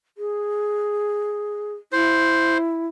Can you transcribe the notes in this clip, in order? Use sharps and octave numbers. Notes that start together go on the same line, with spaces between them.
G#4
E4 C5